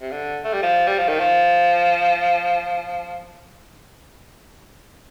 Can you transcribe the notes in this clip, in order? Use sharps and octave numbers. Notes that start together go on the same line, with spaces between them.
C3
D3
A3
G3
F3
G3
F3
D#3
F3